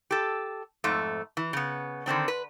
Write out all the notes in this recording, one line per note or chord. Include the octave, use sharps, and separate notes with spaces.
G4 A4
F2 G#2 A3
E3
C#3 B3
D3 D#3 C4 D4
B4